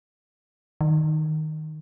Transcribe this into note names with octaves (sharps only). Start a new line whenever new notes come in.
D#3